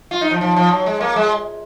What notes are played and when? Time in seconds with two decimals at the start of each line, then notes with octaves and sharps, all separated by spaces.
0.11 F4
0.21 D#4
0.31 F3
0.41 F3
0.56 F3
0.71 F#3
0.86 G#3
1.00 A#3
1.16 G#3